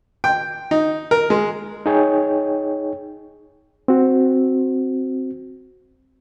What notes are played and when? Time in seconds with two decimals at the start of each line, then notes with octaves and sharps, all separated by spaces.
0.24 G5
0.71 D#4
1.11 A#4
1.30 G#3
1.86 D#4 G#4 C#5 G5
3.88 C4 F#4